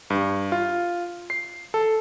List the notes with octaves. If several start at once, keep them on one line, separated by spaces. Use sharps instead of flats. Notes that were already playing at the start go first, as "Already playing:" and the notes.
G2
F4
C7
A4